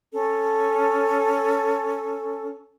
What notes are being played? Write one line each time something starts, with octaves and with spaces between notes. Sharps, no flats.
C#4 A4